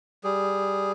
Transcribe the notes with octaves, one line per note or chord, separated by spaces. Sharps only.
G3 G#4